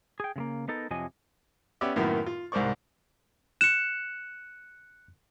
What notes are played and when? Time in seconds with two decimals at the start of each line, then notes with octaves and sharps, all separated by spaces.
0.20 G#4 G5
0.36 C#3 G#3 A#3
0.68 B3 D#4 A4 A#4
0.91 F2 C3 F3 F#3 D#5 G#5
1.81 B3 C#4 G4 D5 E5
1.96 F#2 A2 D#3 A#3 B3 F#4
2.26 F4
2.52 C2 G#2 A#4 C5 D5 C#6
3.61 F#6 C#7 E7